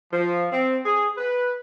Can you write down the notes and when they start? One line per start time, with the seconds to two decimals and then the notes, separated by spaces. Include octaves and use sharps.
0.13 F3
0.52 C4
0.86 G#4
1.18 B4